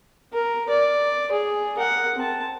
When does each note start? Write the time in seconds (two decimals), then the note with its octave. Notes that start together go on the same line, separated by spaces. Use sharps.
0.33 A#4
0.69 D5
1.32 G#4
1.77 A#4 F#5
2.16 C4 A5